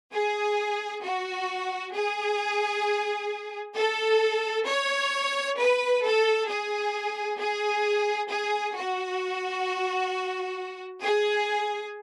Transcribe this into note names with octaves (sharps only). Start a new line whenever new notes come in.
G#4
F#4
G#4
A4
C#5
B4
A4
G#4
G#4
G#4
F#4
G#4